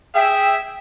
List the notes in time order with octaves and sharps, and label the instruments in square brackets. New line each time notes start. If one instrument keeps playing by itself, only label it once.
[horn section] G#4 E5 [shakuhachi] G5